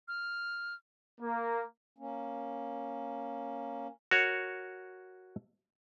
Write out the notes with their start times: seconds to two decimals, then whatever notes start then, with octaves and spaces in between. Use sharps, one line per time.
0.08 F6
1.21 A#3
1.98 A#3 C#4
4.11 F#4 A#4 C#5